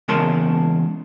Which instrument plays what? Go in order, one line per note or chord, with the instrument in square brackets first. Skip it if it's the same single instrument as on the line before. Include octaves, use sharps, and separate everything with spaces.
[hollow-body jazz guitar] E2 C#3 G#3 A#4 A5 C6